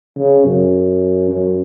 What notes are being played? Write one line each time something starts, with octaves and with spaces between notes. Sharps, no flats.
C#3
F#2
F#2